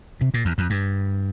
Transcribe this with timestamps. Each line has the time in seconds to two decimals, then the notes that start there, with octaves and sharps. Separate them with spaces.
0.21 C3
0.34 A#2
0.45 E2
0.58 F2
0.70 G2